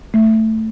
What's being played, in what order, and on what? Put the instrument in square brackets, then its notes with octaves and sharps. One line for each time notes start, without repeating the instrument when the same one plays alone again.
[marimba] A3